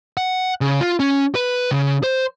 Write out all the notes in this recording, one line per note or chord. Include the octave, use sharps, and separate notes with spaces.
F#5
C#3
F4
C#4
B4
C#3
C5